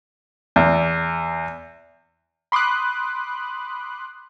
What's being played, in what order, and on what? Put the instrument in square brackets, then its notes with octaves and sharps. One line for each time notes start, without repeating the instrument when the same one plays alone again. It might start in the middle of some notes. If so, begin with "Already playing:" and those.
[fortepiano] E2
[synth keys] B5 C6 D6 D#6 F#6